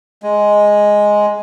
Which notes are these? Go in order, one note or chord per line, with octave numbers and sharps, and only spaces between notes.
G#3